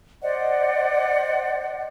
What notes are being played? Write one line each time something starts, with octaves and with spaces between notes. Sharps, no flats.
C5 D5 D#5 F#5